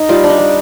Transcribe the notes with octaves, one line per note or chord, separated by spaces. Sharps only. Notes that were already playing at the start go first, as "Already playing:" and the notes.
Already playing: D#4
G3 F4
D4
D#4
G3